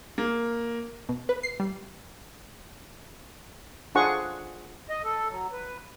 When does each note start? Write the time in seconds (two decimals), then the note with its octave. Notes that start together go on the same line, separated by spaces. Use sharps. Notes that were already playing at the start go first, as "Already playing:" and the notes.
0.18 A#3
1.09 B2
1.29 B4
1.43 C7
1.60 G3
3.95 D4 F4 G#4 C5 F#5 C#6
4.89 D#5
5.04 A4
5.29 F#3
5.52 B4